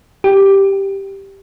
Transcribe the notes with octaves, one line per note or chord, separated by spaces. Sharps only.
G4